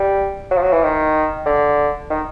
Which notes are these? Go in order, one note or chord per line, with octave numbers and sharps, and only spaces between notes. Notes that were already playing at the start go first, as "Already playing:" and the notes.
Already playing: G3
F#3
F3
F#3
E3
D#3
D3
D#3